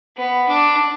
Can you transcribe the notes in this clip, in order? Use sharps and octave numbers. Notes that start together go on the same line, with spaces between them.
B3
D4